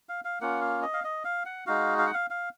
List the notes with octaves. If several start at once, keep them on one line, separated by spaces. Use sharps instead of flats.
F5
F5
A#3 C#4 F4 F#5
F5
D#5
F5
D#5
F5
F#5
G#3 D#4 F#4 F5
F5
F#5
F5
F5